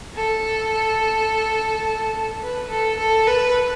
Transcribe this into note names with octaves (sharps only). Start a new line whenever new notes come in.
A4
B4
A4
A4
B4